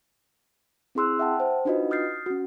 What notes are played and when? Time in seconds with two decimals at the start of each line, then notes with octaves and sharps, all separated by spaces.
0.95 C4 E4 G#4 C6 E6 F#6
1.19 E5 F#5 G5 A5
1.40 C5
1.65 D4 D#4 F4 F#4 B4 D#5
1.91 D#6 F6 G6 A6 C7
2.26 C#4 F#4